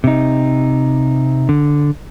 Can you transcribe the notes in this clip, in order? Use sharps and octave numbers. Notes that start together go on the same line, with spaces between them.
C3 D#4
D3